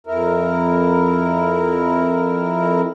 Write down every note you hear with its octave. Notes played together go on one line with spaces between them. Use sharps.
F2 E4 A#4